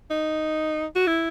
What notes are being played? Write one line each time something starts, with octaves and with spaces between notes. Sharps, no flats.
D#4
F#4
E4